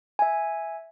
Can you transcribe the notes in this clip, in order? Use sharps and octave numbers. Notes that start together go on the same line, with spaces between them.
E5 G#5